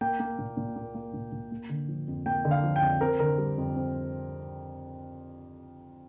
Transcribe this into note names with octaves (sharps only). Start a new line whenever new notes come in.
A#3 G5
A#3
A#2
A#2
A#3
A#3
A#2
A#2
A#3
D3
F3
F2
A#3 G5
D3
F5
F3
G5
F2
C4 A#4
D3 A#4
G3
F2
C4